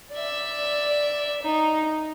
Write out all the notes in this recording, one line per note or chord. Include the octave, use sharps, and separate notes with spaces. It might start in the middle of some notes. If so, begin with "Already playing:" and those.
D5 E5
D#4